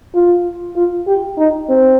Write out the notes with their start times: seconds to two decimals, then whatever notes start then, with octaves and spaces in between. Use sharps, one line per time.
0.14 F4
0.76 F4
1.07 G4
1.37 D#4
1.69 C4